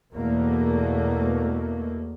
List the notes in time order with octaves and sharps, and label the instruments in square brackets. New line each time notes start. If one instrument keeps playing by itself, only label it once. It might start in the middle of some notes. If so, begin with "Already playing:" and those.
[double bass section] E2 B2 A3 A#3